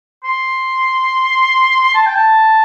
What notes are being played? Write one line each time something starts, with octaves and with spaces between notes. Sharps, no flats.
C6
A5
G5
A5